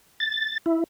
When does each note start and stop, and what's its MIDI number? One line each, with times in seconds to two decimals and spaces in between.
0.20 0.58 93
0.66 0.84 64